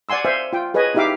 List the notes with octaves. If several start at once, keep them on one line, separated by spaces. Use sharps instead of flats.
D5 F#5 G#5 C6 E6
C5 E5 F5 G#5
F4 G5
G#4 B4 C#5 D#5 G#5
D#4 E4 G4 E5 F5 D6